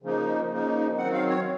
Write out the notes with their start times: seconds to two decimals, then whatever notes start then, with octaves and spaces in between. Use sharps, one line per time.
0.02 C#3 F3 A#3 D#4
0.50 C#3 F3 A#3 D#4
0.97 D#3 F#3 C4 F#5
1.13 F5
1.29 C#5